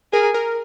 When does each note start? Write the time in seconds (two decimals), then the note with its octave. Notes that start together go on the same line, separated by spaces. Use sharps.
0.13 G#4 A#4
0.34 A#4